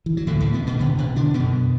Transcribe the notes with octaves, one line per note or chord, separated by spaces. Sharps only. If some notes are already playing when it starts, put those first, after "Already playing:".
E3
F#3
D2 A2 D3 A3
A2 A3
B2 B3
B2 B3
D2 B2 D3 B3
B2 B3
D3 D4
F#2 B2 D3 B3